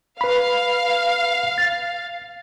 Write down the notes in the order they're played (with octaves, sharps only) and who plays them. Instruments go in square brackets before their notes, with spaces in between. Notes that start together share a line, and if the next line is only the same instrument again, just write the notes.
[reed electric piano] B4 B5 [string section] F5
[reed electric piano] A6